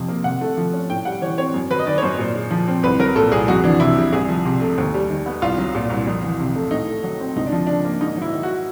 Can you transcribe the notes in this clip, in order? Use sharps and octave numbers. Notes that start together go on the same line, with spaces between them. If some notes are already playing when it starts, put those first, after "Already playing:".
Already playing: F2 C3 F3
A#3
C3 F#5
A3
F3
C#4
A2 G5
G3 F#5
E3 C#5
C4 C#5
F#2
F#3 B4
D#5
D#3 D5
C#5
F#2 C5
A#2
G#3
F3
C4
C2 B4
F#3 A#4
A#2 A4
C2 G#4
F2 F#4
E3 D4
C3 E4
G3
C2 G#4
F3
C3
A3
D#2
G3
D#3
B3
C2 F4
F#3
A#2
C2
F2
E3
C3
A3
A2 D#4
A3
F#3
C4
C#2 D#4
D4
F3
C#3 D4
A#3
G#2 D#4
F#3 E4
D#3
F#4